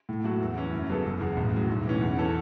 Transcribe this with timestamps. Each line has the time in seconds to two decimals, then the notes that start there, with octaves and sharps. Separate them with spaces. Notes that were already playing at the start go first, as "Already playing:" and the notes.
0.09 A2
0.24 F#3 A3 F#4
0.40 E2
0.56 E3 C#4 E4
0.72 F#2
0.89 C#3 F#3 B3 A4
1.05 F#1
1.20 E2 C#3
1.37 A1
1.54 A2 F#3
1.70 B1
1.85 A2 E3 C#4
2.01 E2
2.17 E3 C#4 A4